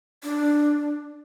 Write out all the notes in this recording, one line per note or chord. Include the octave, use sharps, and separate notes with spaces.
D4